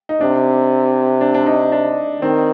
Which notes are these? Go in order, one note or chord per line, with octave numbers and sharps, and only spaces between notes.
D#4
C3 D4
D4
D4
D#4
D4
D#3 C4